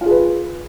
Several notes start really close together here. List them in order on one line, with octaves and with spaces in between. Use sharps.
F4 G#4 B4